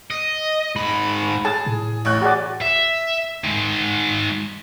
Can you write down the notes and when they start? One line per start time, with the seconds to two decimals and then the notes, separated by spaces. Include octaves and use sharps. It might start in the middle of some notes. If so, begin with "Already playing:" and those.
0.10 D#5
0.76 G#2 B5
1.45 G#4 A5
1.66 A2
2.05 A1 C#6 F#6
2.22 F#4 G#4 D5
2.62 E5
3.44 D#3 G#3